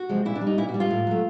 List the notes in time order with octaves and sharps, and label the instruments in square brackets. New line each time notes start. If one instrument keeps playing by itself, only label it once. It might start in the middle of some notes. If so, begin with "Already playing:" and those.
Already playing: [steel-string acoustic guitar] F#4
C3 F3 G#3
A#2 E4
D4
G3
D#4
A#2 E4
F#4
G3
F4
A2
F#3 A3